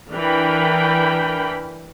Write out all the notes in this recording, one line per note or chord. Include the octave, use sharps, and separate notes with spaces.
E3 D4 A#4 G5 B5